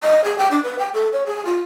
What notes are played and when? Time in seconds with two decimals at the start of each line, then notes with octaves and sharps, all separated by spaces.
0.03 D#5
0.24 G#4
0.38 G5
0.51 D4
0.63 B4
0.79 G5
0.94 A4
1.13 C#5
1.26 G#4
1.45 F4